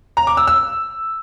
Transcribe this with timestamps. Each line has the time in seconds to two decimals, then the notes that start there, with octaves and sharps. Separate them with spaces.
0.17 A#5
0.27 D6
0.37 E6
0.47 E6